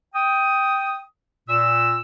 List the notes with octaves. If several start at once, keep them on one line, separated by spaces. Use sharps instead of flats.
G5 D#6
A#2 E6